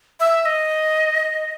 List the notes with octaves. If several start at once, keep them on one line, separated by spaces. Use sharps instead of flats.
E5
D#5